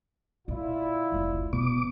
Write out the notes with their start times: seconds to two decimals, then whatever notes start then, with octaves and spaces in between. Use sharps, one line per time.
0.48 A#2 D3 E4 F4 D5
1.12 F1 C#2
1.53 B2 B3 D6